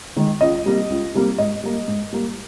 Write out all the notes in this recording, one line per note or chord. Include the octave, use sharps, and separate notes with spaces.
D#3 G#3
C#2 D#5
C3 G3 A#3
C#2
C3 G3 A#3
G#2 D#5
G3 A#3
G#2
G3 A#3